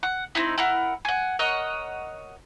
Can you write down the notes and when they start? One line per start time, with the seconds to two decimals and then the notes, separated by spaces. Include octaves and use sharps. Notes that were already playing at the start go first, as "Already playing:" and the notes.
0.03 F#5
0.35 C4 D#4 E4
0.58 E4 A#4 F#5
1.05 F#5 G#5
1.39 A#4 C#5 D#5 F#5